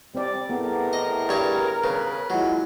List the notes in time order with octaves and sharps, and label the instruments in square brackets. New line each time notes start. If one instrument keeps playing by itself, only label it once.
[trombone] G3 [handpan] C4 D5
[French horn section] A2 G#4 [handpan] B3 [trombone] A#4
[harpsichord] D#5
G2 C#5
[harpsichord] C#3 [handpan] B4
[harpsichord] F#3 [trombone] G#3 [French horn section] A#3 E4 F4